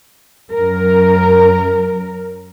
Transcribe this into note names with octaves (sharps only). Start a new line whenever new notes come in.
F#2 A#4